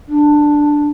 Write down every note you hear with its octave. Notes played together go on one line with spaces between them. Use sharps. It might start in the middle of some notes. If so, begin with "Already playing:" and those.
D4